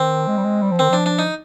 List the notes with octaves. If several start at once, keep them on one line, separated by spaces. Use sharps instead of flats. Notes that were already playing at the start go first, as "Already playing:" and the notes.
Already playing: D#3 C4
G#3
G3
G#3
G3
F3
D#3 C4
F3 D4
D4
D#4